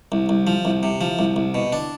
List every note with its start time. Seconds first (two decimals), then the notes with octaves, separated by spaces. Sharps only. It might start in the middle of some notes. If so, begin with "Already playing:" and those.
0.12 C2
0.29 C2
0.47 F3
0.65 C2
0.83 C3
1.01 F3
1.19 C2
1.36 C2
1.55 B2
1.72 D4